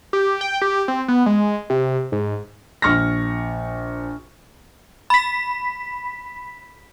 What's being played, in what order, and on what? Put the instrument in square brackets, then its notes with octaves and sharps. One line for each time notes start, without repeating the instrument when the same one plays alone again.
[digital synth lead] G4
G5
G4
C4
B3
G#3
C3
G#2
[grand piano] A#1 C#6 F6 A#6
[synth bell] B5 B6